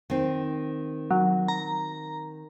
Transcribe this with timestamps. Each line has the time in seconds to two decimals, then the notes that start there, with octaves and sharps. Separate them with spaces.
0.10 D#3 C4
1.11 F#3
1.48 A#5